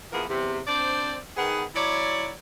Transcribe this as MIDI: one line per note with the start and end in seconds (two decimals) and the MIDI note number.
0.13 0.25 52
0.13 0.25 53
0.13 0.25 59
0.13 0.25 64
0.13 0.25 68
0.13 0.25 70
0.29 0.59 40
0.29 0.59 48
0.67 1.16 60
0.67 1.16 62
0.67 1.16 72
0.67 1.16 74
1.37 1.64 51
1.37 1.64 59
1.37 1.64 68
1.75 2.30 54
1.75 2.30 64
1.75 2.30 73
1.75 2.30 74